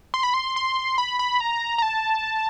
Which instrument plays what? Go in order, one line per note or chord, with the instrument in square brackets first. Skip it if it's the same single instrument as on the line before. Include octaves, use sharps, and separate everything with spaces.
[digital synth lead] C6
B5
C6
C6
B5
B5
A#5
A#5
A5